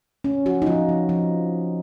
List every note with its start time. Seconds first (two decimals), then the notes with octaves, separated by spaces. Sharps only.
0.24 C#4
0.46 F3 F#4
0.62 D#4
0.66 F3 F4
0.89 F3
1.09 F3